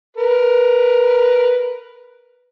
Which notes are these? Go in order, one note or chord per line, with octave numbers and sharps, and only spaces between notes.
A#4 B4